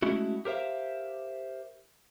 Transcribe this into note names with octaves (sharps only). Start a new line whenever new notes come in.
G#3 A3 C#4 E4 F#4
G4 A#4 C5 E5 F5